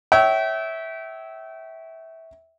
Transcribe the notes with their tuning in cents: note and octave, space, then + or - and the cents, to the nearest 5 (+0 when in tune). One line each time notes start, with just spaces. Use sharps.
C#5 +0 E5 -15 G5 -35